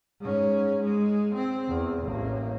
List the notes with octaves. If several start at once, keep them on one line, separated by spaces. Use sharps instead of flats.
G#2 C#4
G#3
C4
E2
A1 A#3